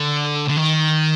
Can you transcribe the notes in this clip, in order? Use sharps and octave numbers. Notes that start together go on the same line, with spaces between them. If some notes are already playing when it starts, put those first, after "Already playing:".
Already playing: D3
D3
D#3